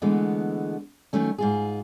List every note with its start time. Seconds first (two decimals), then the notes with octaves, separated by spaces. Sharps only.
0.02 D3 E3 G#3 A3 B3
1.13 D#3 F#3 A3 C#4
1.38 G#2 F4 G#4